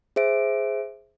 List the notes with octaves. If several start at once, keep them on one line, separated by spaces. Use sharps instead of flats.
G#4 C5 E5 D7